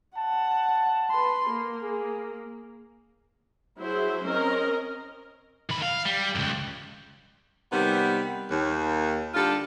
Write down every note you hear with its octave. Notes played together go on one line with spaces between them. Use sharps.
F#5 A5
B4 C6
A#3
G#4
F#3 E4 G#4 C5 E5
C4 C#4 A#4 D#5
D#3 B5
F5
G3
C#2 F#2
C3 D#3 G3 B3
D#2
D3 G3 D4 F4 A4